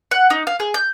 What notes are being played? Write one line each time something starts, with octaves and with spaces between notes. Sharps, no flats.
F#5
D#4
F5
G#4
G6